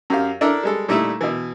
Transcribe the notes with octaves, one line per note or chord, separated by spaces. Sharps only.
F#2 G4 F5
D4 E4 A4 A#4 D5
G3 G#3 A4
A#2 G3 A3 D#4 E4
B2 E3